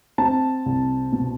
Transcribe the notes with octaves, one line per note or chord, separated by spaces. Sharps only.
C4 A5
C2
B2